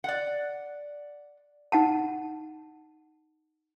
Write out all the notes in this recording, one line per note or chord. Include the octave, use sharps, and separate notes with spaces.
D5 F#5
D#4 F#5 A5